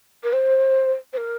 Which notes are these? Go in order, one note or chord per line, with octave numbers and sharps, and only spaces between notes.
A#4
C5
C5
A#4